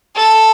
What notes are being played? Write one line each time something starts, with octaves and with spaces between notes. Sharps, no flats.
A4